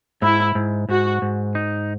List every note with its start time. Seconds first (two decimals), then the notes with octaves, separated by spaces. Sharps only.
0.22 G#2 E4
0.55 G#2
0.89 G#2 F#4
1.22 G#2
1.55 D#4